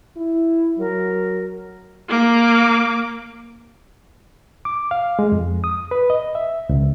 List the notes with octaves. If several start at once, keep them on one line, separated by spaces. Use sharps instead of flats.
E4
F#3 A#4
A#3 D6
D6
F5
G#3
F2
D#6
B4
D#5
E5
C#2